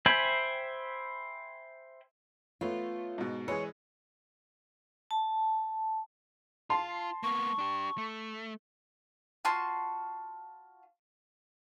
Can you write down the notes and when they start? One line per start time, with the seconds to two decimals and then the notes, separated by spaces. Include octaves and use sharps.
0.06 C5 E5 G5 G#5 B5
2.61 A3 B3 F4 C#5
3.18 G#2 B2
3.48 E3 G#3 G#4 C#5
5.11 A5
6.70 F4 A5 C6
7.23 A#3 B3 C#6
7.59 D4 G4
7.98 A3
9.45 F4 F#4 A5 C6